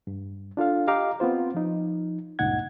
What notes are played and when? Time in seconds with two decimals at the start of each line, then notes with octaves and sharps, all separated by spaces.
0.07 G2
0.57 D4 F4 A4 F5
0.88 G4 D#5 F5 A#5 D6
1.20 B3 C4 F4 C5
1.54 F3 D#4
2.39 C#2 G2 A#2 D#4 F#5 G#6